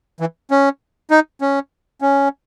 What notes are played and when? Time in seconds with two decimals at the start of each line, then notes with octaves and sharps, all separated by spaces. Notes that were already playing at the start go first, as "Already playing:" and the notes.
0.20 E3
0.51 C#4
1.11 D#4
1.41 C#4
2.01 C#4